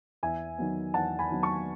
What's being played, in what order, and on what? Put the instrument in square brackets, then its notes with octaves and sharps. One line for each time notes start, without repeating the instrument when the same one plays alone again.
[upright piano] E2 E5 G#5
D#3 F#3 B3
E2 F#5 A5
G#5 B5
D#3 F#3 B3
A5 C#6